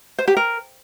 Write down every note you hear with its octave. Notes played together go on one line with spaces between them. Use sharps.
C5
G4
A#4